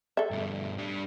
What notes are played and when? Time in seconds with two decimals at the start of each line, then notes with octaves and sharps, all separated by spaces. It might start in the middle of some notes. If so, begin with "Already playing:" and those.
0.17 A4 E5
0.31 G2 B2
0.78 G3 D4